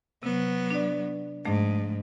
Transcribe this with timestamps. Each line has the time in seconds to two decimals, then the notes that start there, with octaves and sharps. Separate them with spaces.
0.23 C3 F#3 B3
0.70 D4 D5
1.45 G#2 F3 A3 D4